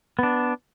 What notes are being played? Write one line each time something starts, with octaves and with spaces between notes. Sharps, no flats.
B3 D4